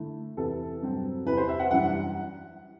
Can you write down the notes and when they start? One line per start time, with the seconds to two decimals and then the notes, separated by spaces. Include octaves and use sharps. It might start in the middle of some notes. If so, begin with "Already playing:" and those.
Already playing: D3 A3 E4
0.37 E2 C3 E3 B3 E4 A4
0.82 G2 F#3 C4
1.26 E2 C3 E3 B4
1.37 C5
1.49 E5
1.59 F#5
1.71 F#2 E3 G3 D4 F#5